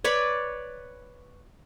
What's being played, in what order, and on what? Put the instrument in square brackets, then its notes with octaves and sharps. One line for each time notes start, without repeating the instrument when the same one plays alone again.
[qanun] B4 C#5 D5 B5